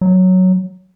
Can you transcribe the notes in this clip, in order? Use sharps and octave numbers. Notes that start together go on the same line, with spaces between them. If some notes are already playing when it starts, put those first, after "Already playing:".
F#3